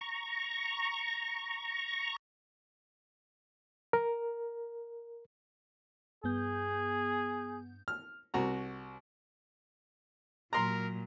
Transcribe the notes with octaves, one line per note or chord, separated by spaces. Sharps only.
A#5 C#6
A#4
G2 B3 G#4 G6
F6
C2 F#4 A#5
A#2 F#3 A#4 A#5 C6